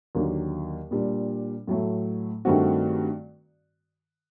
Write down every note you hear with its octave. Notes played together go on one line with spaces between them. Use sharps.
D#2 D3 F#3 A#3
A#2 G3 D4
A2 F#3 A3
G2 D#3 A3 C4 F#4